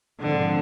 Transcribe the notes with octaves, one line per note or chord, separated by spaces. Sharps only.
G#2 D3 F3 C4